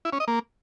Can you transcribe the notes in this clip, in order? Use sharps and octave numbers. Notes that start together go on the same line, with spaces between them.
E4
C#4
D#5
A#3